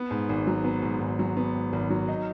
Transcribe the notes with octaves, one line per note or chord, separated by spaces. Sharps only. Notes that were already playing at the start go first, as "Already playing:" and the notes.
Already playing: B3
G#2
G#1
F#3
B3
G#2
G#1
F#3
B3
G#2
G#1
F#3
D#4